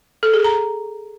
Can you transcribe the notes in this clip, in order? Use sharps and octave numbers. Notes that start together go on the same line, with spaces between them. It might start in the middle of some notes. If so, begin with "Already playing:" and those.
A4
G#4
A#5